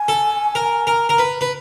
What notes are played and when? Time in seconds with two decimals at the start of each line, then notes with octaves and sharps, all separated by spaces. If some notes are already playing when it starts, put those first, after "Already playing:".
Already playing: G#5
0.08 A4
0.55 A#4
0.87 A#4
1.09 A#4
1.18 B4
1.41 B4